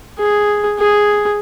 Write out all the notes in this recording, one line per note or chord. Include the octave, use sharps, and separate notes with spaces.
G#4
G#4